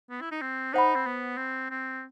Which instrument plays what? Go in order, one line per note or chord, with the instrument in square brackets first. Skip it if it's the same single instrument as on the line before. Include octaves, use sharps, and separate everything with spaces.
[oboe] B3
E4
D#4
C4
[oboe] D#4 [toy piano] C5 F#5 B5
[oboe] C4
B3
C4
C4